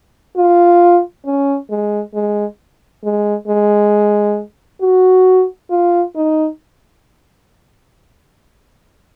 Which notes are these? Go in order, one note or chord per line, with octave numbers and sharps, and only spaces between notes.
F4
C#4
G#3
G#3
G#3
G#3
F#4
F4
D#4